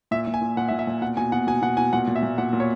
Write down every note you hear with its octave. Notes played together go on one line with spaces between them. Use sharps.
A#2 E5
A#2
G#5
A#2
A#2 F#5
E5
A#2
E5
A#2
B2 F#5
B2 G#5
B2 F#5
B2 G#5
B2 F#5
B2 G#5
A#2 F#5
A#2
E5
A#2
A#2 F#5
A#2
C#5